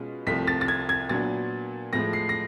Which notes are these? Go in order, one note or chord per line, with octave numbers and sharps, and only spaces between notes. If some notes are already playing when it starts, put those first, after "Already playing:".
Already playing: B2 G#3 C#4 F4
C2 C3 F3 A3 C4 B6
A6
A6
G#6
G#6
A#2 F#3 B3 D4 A6
A2 F3 G#3 A#6
C7
A#6